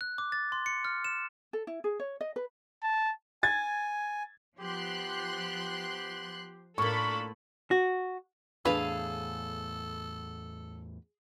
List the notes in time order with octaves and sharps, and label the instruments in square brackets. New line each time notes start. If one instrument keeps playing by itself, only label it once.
[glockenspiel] F#6
D6
A6
C6
C#7
F6
E7
[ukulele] A4
E4
G#4
C#5
D#5
B4
[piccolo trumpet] A5
[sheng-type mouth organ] G#5 [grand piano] G#6 A6
[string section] F3 C6 F#6 [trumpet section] B3 G4
[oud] A2 A#3 [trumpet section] D4 F4 A#4 [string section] A4 B5 [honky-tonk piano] C#6
[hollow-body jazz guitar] F#4
[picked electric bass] E2 A2 [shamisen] D4 B4 [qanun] G#4 F5 [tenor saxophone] A4